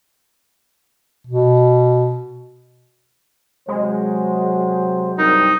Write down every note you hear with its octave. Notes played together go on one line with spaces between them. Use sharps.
B2
C3 F#3 G#3 C5
C2 G2 C4 D#4 A#4